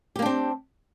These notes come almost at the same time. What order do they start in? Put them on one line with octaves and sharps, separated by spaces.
G4 A#3 D4 C4